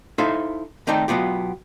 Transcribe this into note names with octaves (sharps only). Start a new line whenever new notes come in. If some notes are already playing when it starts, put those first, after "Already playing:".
D#4 E4 A4 C5 E5 F5
D#3 A3 C4 D#4 D5 G5
B2 F#3 B3 F4 G4